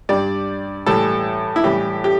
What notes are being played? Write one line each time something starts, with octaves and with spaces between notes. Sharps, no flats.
G2 G3 D5
A2 E3 G3 A4
E4
A2 E3 G3 G4
G4